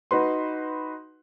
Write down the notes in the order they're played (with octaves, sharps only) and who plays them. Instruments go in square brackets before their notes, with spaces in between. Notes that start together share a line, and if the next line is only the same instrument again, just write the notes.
[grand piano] D#4 F#4 B4 C6